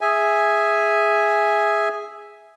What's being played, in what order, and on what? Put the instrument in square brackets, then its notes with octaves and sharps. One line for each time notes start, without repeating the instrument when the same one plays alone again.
[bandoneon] G#4 E5 G#5